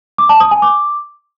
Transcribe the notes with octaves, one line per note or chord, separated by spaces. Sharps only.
D6
A5
D#6
G#5
D6